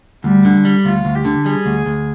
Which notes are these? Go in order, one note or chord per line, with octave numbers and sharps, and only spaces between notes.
D2 G3
D3
G3
D2 F4
D2
G4
D3
G3 G#4
D2
D2